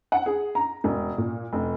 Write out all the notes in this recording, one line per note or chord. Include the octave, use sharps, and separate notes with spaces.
F#5
G#4
A#5
E1
A#2
F1